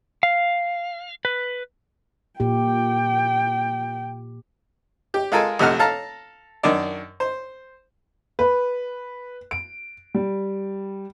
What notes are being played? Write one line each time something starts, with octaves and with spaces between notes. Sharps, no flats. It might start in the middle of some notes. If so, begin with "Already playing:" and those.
F5
B4
A#2 G4 G5
G4
G#3 F4 A4 A#4 G#5
A#1 C3 A3 F#5 F6
A4 F5 A5 A#5
F#2 D#3 D4 D5
C5
B4
D7
G3